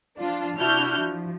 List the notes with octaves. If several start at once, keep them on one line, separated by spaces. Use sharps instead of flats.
F3 D4 F4
C3 D4 E4 F#4 F6 G6
F3